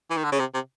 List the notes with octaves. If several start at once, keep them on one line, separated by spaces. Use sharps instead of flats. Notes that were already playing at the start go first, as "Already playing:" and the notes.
E3
D#3
D3
C#3
C3
C3